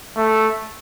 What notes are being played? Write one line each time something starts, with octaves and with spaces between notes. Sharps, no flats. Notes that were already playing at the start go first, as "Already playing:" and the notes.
A3